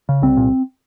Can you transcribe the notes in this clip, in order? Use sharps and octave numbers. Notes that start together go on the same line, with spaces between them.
C#3
C2 C4
A#2